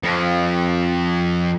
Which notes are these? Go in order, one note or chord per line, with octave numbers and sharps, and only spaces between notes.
F2 F3